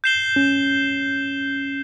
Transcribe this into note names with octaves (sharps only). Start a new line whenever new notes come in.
G6 C7 E7 G7
C#4